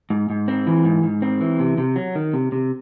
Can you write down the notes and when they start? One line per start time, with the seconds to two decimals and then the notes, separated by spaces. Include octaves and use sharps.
0.10 G#2
0.30 G#2
0.48 C4
0.67 E3
0.85 G#2
1.03 G#2
1.22 C4
1.41 E3
1.59 C3
1.78 C3
1.96 F#3
2.15 D#3
2.33 C3
2.52 C3